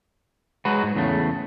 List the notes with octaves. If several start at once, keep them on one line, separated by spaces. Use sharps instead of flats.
F#3 G#3 F#4 B4
G#2
E2 C#3 A3